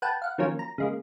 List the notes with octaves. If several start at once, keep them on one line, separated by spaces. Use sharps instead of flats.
B4 F#5 G5 A5
F5 F#5
D#3 F3 F#3 A#3 C#4
A#5
C#3 G#3 A#3